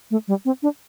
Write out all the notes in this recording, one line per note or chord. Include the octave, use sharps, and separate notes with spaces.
A3
G3
C4
D4